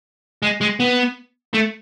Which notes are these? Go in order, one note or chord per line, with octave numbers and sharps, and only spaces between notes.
G#3
G#3
B3
A3